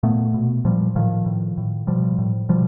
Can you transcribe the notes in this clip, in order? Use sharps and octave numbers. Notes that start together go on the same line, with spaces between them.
A#2 A3 B3
B2
A#2 F3 G3
A2 D#3 F3
A2
A2
B2 F3 G3
A2
B2 F3 G3